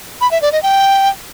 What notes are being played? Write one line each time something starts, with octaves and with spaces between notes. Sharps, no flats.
B5
E5
D5
D#5
G5